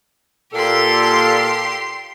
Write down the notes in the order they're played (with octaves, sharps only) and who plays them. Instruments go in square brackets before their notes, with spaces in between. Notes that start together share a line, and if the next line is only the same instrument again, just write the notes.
[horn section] A#2 A4 [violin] G4 C6